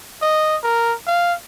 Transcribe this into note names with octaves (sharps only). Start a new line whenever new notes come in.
D#5
A#4
F5